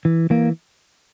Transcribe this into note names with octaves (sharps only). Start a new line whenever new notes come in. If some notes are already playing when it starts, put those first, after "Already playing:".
E3
E3 A#3